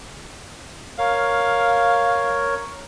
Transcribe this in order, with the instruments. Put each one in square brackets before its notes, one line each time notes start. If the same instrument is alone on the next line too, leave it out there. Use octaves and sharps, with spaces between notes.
[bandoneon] A#4 C#5 [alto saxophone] F5